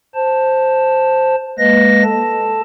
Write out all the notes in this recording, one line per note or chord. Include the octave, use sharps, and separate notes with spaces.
C5 A5
G#3 A#3 B4 D#5 A#6
A4 A5